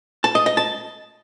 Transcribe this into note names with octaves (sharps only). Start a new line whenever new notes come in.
A5
D#5
D#5
A5